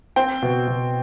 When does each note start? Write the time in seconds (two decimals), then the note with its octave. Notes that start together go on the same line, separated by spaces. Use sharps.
0.16 C4 G5
0.42 B2
0.68 B2